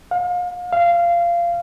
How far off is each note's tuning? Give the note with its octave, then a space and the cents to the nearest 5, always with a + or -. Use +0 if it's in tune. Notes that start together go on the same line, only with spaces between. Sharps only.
F5 +35
F5 -20